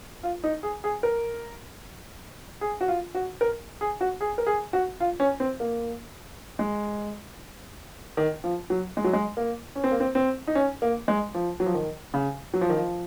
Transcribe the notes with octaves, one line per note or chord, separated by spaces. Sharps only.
F4
D#4
G#4
G#4
A#4
G#4
F#4
F4
F#4
A#4
G#4
F#4
G#4
A#4
G#4
F#4
F4
C#4
C4
A#3
G#3
D#3
F3
F#3
G#3
F#3
G#3
A#3
C#4
C4
A#3
C4
C4
D#4
C#4
A#3
G#3
F3
F#3
F3
D#3
C#3
F#3
F3
D#3
F3